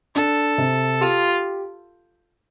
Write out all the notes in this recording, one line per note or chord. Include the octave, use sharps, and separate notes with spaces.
D4 A4
C3
F4 G4